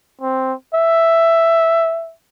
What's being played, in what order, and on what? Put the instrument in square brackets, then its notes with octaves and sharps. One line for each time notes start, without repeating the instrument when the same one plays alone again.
[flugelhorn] C4
E5